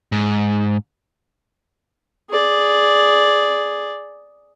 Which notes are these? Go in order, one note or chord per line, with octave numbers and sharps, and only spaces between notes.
G#2
G#4 D5